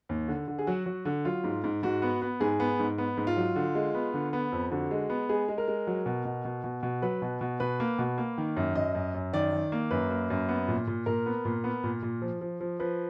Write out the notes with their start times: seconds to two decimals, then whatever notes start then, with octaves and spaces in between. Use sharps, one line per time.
0.09 D#2
0.28 D3
0.48 D3
0.59 G#4
0.67 F#3 F#4
0.86 F#3
1.05 D3
1.25 F#3 F4
1.44 G#2
1.64 G#2
1.83 G#2 F#4
2.02 B3
2.22 B3
2.40 G#2 G#4
2.60 B3
2.79 G#2
2.98 B3
3.17 G#2
3.27 F4
3.37 F#3
3.56 D3
3.75 G#3
3.94 B3
4.14 D3
4.33 B3
4.52 F2
4.71 D3 F#4
4.91 G#3
5.10 B3
5.29 G#3 G#4
5.48 G#3
5.58 A#4
5.68 G#3
5.87 F#3
6.06 B2
6.25 B2
6.45 B2
6.64 B2
6.83 B2
7.02 F#3 B4
7.22 B2
7.41 B2
7.60 B2 B4
7.80 A#3
7.99 B2
8.18 A#3
8.38 D#3
8.56 F#2
8.75 F#2 D#5
8.95 F#2
9.14 F#2
9.33 D#3 D5
9.53 D#3
9.72 A#3
9.91 F#2 B4
10.10 A#3
10.30 F#2
10.48 B3
10.68 A#2
10.87 A#2
11.06 A#2 A#4
11.26 B3
11.45 A#2
11.64 B3
11.84 A#2
12.02 A#2
12.22 F3
12.41 F3
12.61 F3
12.79 F3 B4